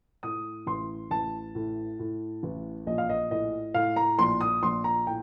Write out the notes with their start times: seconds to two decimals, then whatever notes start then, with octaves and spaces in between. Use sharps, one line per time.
0.23 A2 D#6
0.67 A1 C6
1.11 A1 A5
1.55 A2
1.99 A2
2.43 A1
2.87 A#1 D#5
2.98 F5
3.09 D#5
3.31 A2 D#5
3.74 A2 F5
3.96 A#5
4.19 A#1 C6
4.41 D#6
4.63 A#1 C6
4.84 A#5
5.07 A2 G5